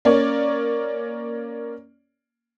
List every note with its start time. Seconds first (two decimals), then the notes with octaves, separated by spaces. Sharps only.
0.05 A#3 C#4 C#5 D5